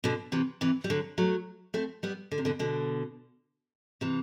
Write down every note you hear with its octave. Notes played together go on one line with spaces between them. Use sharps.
B2 D3
C3 E3
C3 E3
G3
D3 F#3
F#3 A3
A3 C4
G3 B3
D3
C3
B2 D3
B2 D3
C3 E3